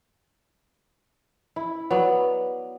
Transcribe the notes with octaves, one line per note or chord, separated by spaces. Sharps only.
E4
F#3 B3 D5 E5